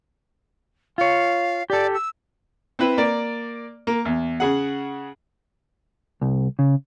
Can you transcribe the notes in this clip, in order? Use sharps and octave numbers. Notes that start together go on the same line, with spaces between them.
F4 C#5 F5
G4 A4 D5
E6
C4 E4 B4
A#3 D5
A#3
E2
C#3 G#4 F#5
C2
C#3